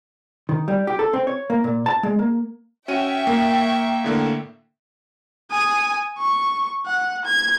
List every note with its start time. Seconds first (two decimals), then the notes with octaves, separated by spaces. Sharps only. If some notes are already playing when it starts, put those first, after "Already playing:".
0.49 D#3
0.68 G3
0.87 G4
0.99 A4
1.13 C4
1.27 C#5
1.50 A#3
1.64 A#2
1.86 A5
2.03 G#3
2.19 A#3
2.88 C#4 F#4 E5 G5 C#6 D#7
3.27 A#3
4.04 A2 D3 A#3
5.51 G#5 D#6
6.19 C#6
6.86 F#5
7.25 G#6